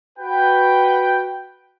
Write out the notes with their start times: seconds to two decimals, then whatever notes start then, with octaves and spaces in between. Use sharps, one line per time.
0.18 F#4 B4 G5